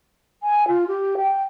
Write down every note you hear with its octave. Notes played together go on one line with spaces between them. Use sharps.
G#5
F4
G4
G5